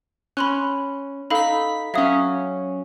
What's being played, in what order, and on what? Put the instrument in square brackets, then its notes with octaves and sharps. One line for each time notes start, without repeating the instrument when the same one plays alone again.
[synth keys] C#4 [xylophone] B5 C6 F#6
[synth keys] D#4 B6 [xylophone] A4 F5 B5
[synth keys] F#3 C#4 [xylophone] E5 F5 D#6